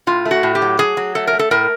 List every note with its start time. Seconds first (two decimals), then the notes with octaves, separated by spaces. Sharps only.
0.07 A2 F4
0.25 A3
0.31 F#4
0.43 A2
0.55 G4
0.62 F#3
0.79 F#3 G#4
0.97 F#3
1.15 A3 A4
1.27 A#4
1.33 A3
1.39 A4
1.51 A2 A#4